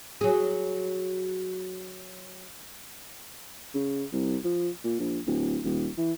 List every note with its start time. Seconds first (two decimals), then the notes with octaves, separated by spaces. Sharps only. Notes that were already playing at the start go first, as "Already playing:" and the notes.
0.21 F#3 G#4
3.75 C#3
4.13 C2
4.44 F3
4.84 A#2
4.99 A#1
5.27 D1
5.64 D#1
5.98 E3